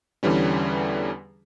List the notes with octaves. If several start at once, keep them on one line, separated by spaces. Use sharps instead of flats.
E2 D3 E3 G3 C#4